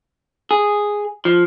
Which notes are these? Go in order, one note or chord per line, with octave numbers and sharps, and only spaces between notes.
G#4
F3